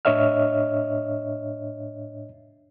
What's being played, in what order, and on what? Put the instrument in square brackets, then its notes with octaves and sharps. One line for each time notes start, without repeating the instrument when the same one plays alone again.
[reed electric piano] A2 D4 C#5 D#5 E5 F6